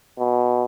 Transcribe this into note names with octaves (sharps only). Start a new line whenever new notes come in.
B2